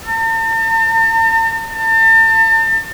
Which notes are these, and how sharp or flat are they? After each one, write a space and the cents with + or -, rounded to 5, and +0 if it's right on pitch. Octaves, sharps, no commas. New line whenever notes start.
A5 +45
A5 +40